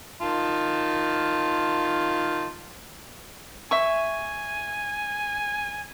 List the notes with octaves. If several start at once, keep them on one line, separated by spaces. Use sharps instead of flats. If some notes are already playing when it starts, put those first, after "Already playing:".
D#3 F4 A5
E5 G#5 C#6